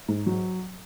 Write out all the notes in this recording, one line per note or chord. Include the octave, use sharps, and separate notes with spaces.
G#2
F#3